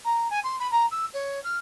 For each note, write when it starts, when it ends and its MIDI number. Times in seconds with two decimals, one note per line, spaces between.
0.04 0.28 82
0.30 0.40 80
0.43 0.56 84
0.59 0.70 83
0.71 0.86 82
0.91 1.05 88
1.13 1.42 73
1.44 1.58 89